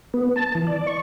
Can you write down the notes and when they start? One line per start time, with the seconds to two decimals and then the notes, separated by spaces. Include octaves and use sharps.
0.14 B3
0.36 A5
0.55 E3
0.67 D5
0.87 C#6